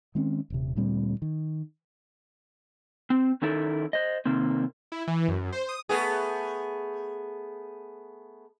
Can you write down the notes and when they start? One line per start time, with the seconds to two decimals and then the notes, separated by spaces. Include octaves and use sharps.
0.15 D#3 G#3 C4 C#4
0.50 D#1 C3
0.76 D2 A#2 G3 C4
1.22 D#3
3.10 C4
3.42 D#3 C#4 D#4 E4 A4 A#4
3.93 C5 D#5
4.26 C3 D#3 A#3 C4
4.92 E4
5.07 E3
5.28 F#2
5.52 C5
5.69 D#6
5.89 A3 B3 G#4